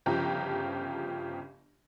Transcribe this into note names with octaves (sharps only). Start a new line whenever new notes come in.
G1 C#3 F3 G4 A#5